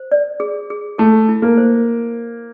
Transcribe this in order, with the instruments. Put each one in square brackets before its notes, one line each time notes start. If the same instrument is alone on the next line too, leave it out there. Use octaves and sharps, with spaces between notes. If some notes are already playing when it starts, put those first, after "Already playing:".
Already playing: [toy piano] C5
D5
G#4
G#4
[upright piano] A3 [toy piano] A4
[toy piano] E4
[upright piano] A#3
[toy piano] C5